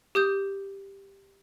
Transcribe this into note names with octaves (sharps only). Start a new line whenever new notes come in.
G4 D#6 G6